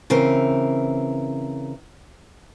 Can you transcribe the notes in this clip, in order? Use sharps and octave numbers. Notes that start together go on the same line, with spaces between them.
C#3 E3 C4 A#4